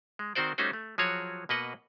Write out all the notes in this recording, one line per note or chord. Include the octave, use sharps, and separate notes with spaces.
G#3
D#3 C4 F#4 C5 D5
G3 A3 C#4 D#4 F#4 C5
A3
F3 F#3 F#4 G#4 C#5
B2 A#3 B4 D#5 F#5